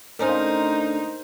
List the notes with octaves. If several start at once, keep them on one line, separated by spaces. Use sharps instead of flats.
D2 C#4 D#4 A#4 C5 F5